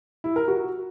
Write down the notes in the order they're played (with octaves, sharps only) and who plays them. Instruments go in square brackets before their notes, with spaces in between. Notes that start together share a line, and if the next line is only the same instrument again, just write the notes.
[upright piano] E4
A#4
F#4